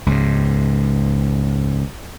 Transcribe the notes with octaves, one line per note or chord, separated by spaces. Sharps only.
C#2 G#2